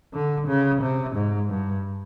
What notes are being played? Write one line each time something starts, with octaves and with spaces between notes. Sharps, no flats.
D3
C#3
C3
G#2
G2